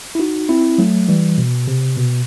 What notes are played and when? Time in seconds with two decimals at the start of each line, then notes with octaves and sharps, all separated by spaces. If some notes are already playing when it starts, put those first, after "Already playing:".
0.15 E4
0.19 D#4 F#4
0.49 C4 E4
0.78 F#3 A3
1.08 E3 G3
1.38 B2
1.68 C3
1.97 B2